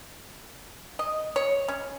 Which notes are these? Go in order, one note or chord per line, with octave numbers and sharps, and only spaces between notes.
D#5
C#5
C#4